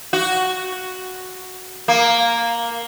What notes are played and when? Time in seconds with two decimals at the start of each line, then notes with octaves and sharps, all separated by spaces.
0.13 F#4
1.88 A#3